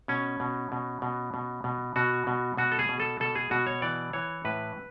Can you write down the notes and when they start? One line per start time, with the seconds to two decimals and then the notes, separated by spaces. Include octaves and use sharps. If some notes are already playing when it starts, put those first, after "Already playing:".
0.08 B2 C#4
0.40 B2
0.72 B2
1.02 B2
1.34 B2
1.64 B2
1.96 B2 F#4
2.27 B2
2.57 B2 F#4
2.72 A4
2.79 G#4
2.89 B2
3.00 A4
3.20 B2 A4
3.35 G#4
3.51 B2 F#4
3.67 C#5
3.82 E3 D5
4.13 E3 C#5
4.45 A2 B4